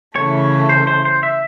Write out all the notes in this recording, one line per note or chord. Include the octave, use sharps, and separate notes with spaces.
C#3 E3 A3 C#5
C5
C5
C5
E5